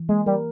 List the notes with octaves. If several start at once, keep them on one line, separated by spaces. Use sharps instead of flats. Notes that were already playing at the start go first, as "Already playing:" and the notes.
Already playing: E3
G#3 A#3
G3 A#4